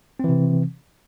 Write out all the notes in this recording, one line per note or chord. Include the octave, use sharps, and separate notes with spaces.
C3 E3 C4